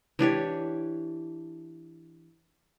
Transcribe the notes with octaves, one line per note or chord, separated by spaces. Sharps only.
E3 D4 G4 C#5